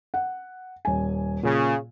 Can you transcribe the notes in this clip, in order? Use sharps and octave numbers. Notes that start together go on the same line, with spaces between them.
F#5
D#1 G#5
A#2 C#3